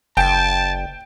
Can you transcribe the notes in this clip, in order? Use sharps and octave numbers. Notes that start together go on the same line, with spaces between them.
F#1 G5 A5